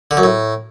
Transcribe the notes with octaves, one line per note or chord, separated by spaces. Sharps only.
D3
F#2
A2